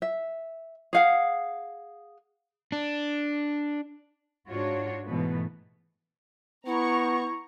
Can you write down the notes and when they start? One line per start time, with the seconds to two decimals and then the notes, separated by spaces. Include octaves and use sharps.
0.02 E5
0.93 G#4 F5 F#5
2.72 D4
4.49 G#2 D4 F4 F#4 C#5
5.06 G#2 B2 E3 A3 B3
6.66 B3 E4 A#5 C#6